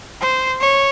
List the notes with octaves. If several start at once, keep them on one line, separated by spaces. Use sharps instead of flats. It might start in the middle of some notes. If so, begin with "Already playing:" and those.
C5
C#5